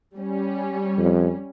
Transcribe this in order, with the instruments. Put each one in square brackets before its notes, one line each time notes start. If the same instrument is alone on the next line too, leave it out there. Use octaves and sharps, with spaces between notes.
[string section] G3 C#4
[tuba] F2